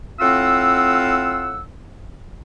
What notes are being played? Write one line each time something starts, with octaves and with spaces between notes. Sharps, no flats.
A2 C4 F4 F5 F#5 E6